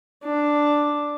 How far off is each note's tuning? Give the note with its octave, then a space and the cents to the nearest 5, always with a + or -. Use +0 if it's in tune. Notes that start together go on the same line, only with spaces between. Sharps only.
D4 +0